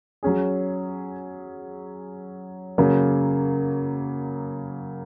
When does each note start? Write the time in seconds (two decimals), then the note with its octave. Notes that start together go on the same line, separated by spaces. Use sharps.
0.23 F#3 C#4 G#4
2.78 C#3 F#3 A#3